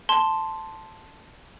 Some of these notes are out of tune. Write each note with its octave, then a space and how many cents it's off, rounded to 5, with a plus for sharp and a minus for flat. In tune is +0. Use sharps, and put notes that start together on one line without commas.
A5 +0 C6 +0